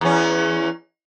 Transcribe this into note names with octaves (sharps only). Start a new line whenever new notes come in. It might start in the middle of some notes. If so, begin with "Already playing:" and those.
E2 C#4